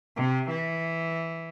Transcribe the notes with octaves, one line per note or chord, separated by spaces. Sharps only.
C3
E3